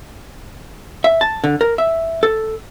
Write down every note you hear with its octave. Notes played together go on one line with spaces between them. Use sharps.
E5
A5
D3
A#4
E5
A4